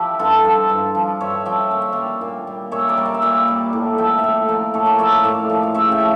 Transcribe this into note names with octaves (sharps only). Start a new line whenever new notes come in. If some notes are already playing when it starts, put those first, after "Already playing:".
Already playing: F3 E4 G4
G2 F4 A4
F3
G2
F3
G2 C#5 E5
F3 E5 G5
A#2 F5
E5
G3 D5 F5
A#2
G3
A#2 C#5 E5
A#4 D5
G3
D5 F5
E5
A#2 D5 F5
G3
A2
F3 E5 G5
E5
A2 D5 F5
F3 A#4 D5
A2 A4 C#5
A#4 D5
F3 C#5 E5
D5 F5
A2 D5 F5
F3
F5
C#3 C#5 E5
E5 G5
F3